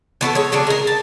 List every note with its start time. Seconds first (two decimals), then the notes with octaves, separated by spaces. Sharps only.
0.21 E3 B3 F#4 A4
0.35 G#3 C#5
0.52 C#3 F#3 G3 D4
0.67 G#3 A#4
0.87 A5